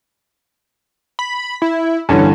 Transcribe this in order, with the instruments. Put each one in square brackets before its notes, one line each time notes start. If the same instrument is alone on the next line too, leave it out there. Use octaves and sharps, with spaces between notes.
[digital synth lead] B5
E4
[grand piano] G2 D3 E3 [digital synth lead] C#4